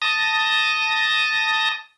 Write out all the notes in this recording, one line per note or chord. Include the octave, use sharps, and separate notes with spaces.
A5 D#6 A#6